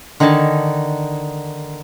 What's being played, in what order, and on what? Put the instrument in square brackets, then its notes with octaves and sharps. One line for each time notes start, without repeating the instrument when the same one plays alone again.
[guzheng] D3 D#3 D#4 G#5 A5